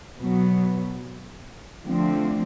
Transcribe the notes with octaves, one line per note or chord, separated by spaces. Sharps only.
B2 F#3 B3
D3 F3 A3 C4